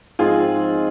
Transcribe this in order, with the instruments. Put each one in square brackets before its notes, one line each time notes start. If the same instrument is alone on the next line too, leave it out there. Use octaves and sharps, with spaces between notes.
[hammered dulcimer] G#2 F3 C4 D#4 [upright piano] F4 G#4